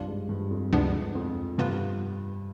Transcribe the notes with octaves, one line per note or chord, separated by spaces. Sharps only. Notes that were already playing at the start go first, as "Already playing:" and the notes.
Already playing: C2 G2 C3 D4 F4
G#2
G2
F2
D2 G#2 C3 F3 B3 D4
F2
G2 C3 F3 B3 F4 B4